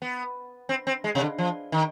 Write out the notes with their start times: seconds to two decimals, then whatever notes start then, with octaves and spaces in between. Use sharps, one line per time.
0.02 B3
0.69 C4
0.87 C4
1.04 G#3
1.15 C3
1.21 D3
1.38 F3
1.72 D#3